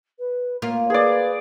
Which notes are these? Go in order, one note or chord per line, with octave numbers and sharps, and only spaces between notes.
B4
A#3 F4 C#5
G#4 B4 D5